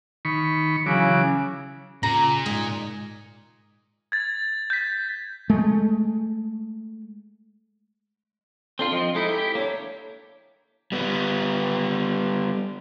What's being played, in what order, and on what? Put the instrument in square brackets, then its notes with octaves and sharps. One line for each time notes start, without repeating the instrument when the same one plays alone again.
[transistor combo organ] D#3 B5 C#6
[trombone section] C#3 [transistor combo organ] E3 F#3 D6
[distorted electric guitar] A#2 [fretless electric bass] C#3 [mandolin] A#5
[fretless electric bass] G#2 G#3 [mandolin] D#5 G#5
[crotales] G#6 A6
G6 B6
[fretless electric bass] G#3 A3
[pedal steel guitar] C4 D4 F4 [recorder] A4
[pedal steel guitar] F3 C4 [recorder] D#5
[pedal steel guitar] G#3 D#4 E4 [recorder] A4
[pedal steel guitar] E4 G4
[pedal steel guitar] A#3 D4 [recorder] C#5
[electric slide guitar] G3 B3